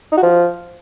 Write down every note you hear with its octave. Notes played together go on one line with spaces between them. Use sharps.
D#4
F#4
F3